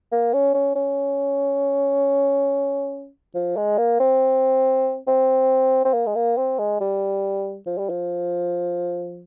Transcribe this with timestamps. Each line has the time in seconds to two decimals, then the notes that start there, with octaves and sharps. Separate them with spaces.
0.12 A#3
0.34 C#4
0.54 C#4
0.76 C#4
3.35 F3
3.57 G#3
3.78 A#3
4.00 C4
5.08 C4
5.85 C4
5.93 A#3
6.06 G#3
6.16 A#3
6.37 C4
6.59 G#3
6.81 G3
7.66 F3
7.78 G3
7.90 F3